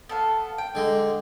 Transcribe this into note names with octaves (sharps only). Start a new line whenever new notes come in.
B3 A4 F5
G5
D3 G#3